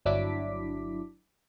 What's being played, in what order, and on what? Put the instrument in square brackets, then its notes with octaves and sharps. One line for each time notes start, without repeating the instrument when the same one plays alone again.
[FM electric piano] G1 F#3 D4 E4 D6 B6